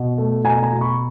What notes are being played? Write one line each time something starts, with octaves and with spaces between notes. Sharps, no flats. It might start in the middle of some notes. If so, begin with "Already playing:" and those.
Already playing: B2
A3
B2 G#5 A#5
G#5 A#5
B2
B5 C#6